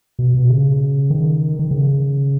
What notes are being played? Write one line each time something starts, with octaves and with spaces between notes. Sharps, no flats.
B2
B2
C#3
D#3
D#3
C#3